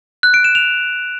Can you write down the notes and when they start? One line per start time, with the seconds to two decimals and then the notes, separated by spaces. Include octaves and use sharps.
0.23 F#6
0.34 D7
0.44 E7
0.55 F7